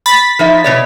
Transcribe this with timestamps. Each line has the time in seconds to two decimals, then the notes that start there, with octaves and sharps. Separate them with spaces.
0.06 B5 A6 B6
0.39 F3 D#4 E5
0.64 B2 C#5 D5